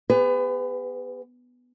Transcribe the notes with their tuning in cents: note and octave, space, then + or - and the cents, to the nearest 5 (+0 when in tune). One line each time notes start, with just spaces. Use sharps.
B3 +0 G#4 -40 B4 +30